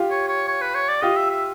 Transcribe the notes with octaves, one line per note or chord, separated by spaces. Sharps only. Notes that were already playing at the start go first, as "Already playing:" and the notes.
Already playing: F4 G4
C#5
C#5
C#5
B4
C#5
D5
F4 G4 D#5
E5
E5